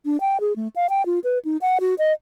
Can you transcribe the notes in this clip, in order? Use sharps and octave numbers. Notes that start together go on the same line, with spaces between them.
D4
G5
G#4
A3
F5
G5
F4
B4
D#4
F#5
F#4
D#5